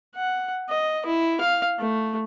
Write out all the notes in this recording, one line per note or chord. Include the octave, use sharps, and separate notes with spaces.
F#5
D#5
E4
F5
A3